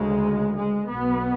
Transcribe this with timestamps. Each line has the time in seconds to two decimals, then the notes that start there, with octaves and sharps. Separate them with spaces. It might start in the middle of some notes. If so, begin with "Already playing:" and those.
Already playing: D2 C#3 G#3
0.54 G#3
0.88 B1 B2 B3